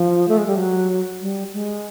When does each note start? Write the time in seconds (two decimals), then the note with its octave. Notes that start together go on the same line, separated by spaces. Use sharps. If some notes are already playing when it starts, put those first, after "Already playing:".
Already playing: F3
0.28 A3
0.38 G#3
0.47 G3
0.57 F#3
1.21 G3
1.53 G#3